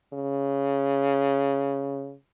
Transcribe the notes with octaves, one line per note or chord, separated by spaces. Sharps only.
C#3